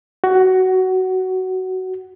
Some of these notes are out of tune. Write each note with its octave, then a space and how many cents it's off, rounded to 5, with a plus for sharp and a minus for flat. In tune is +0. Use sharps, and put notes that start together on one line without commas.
F#4 +15